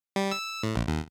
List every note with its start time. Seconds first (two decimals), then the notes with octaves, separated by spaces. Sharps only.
0.16 G3
0.31 E6
0.63 A2
0.76 A#1
0.87 D#2